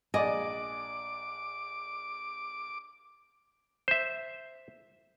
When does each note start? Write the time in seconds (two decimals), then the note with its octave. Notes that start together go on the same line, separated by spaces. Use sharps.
0.14 A#1 D5 D#5 G#5 D6
3.88 C5 E5